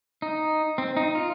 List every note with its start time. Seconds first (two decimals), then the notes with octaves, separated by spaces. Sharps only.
0.22 D#4
0.78 C4
0.97 D#4
1.15 F4